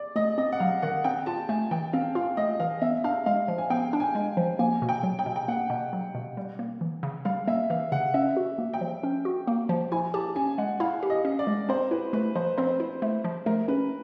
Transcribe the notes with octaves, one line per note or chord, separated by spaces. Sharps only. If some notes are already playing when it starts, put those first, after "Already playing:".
Already playing: D5
A3 D#5
C4 D#5
F#5
F#3 F5
D#3 F#5
C4 G5
F4 A5
A3 G#5
E3 G5
C4 F5
F4 F5
A3 D#5
E3 F5
B3 E5
D4 F5
G#3 F5
F3
G#5
B3 G5
D4
G#5
G#3
F3
A#3 G#5
B2
G5
F#3
G5
B2
G5
A#3 F#5
B2
F#3
B2
G3
A#3
E3
C#3
G3 F5
A#3 E5
E3 F5
C#3 F#5
C#4 E5
F#4
A#3
G5
F3
C#4
F#4
A#3
F3
E4 G#5
G4 A5
C#4 G#5
G#3 F#5
E4 F5
G4
D#5
C#4
D5
G#3
C4 C5
E4 B4
A3 B4
F3 C5
C4 C5
E4
A3
F3
A3 A#4
C#4 B4